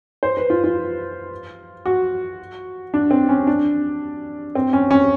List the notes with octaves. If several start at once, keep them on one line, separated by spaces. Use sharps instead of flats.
C5
B4
F4
F4
F#4
D4
C4
C#4
D4
C4
C#4
C#4